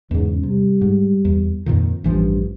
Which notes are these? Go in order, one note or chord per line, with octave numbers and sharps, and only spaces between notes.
E2 G#2 C#3
C3 G3
G#2
E2
F2 A#2 D#3
A1 G2 E3 F3